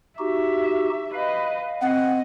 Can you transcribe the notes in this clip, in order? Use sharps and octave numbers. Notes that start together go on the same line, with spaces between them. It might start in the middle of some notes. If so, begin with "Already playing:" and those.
D#4 F#4 G4 E5
B4 D#5 F5
C4 D#5 F#5